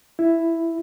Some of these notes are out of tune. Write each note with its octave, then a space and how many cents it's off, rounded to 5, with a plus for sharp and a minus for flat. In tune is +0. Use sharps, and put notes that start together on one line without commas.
E4 +5